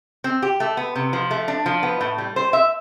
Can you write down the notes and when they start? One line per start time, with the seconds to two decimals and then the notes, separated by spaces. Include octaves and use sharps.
0.24 C4
0.42 G4
0.60 A3
0.77 B3
0.95 C3
1.13 F3
1.31 A3
1.48 D4
1.66 F3
1.83 B3
2.01 A2
2.18 G3
2.36 C5
2.53 E5